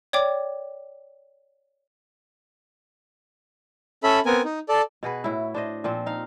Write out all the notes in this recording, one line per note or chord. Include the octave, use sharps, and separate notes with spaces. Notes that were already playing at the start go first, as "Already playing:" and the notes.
C#5 D5 G5 D6
C#4 A4 E5 B5
B3 C4 A#4 G#5
D#4
A4 D5
B2 F#4 G#4 B4
A2 E4
D4 C5 D#5
A#2 F3 C4
D#4 F5